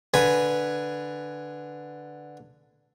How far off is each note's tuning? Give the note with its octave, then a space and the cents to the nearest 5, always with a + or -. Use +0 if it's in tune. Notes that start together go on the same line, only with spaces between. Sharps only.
D3 +0 B4 +0 G#5 +0